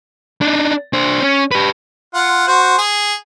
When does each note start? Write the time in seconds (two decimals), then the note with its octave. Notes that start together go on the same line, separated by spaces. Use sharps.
0.41 D4 D#4
0.93 D4 C5
1.22 C#4
1.52 G4 B4
2.14 F4 F#5
2.47 F#4 C5
2.78 G#4